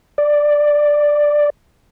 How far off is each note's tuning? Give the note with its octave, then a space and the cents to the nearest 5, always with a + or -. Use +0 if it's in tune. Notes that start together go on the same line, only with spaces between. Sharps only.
D5 +5